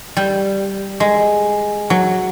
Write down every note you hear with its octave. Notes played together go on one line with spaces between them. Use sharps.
G3
G#3
F#3